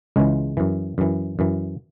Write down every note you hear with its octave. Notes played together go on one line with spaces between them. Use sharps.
C#2 C#3 E3 G#3
F#2 E3
F#2 E3
F#2 E3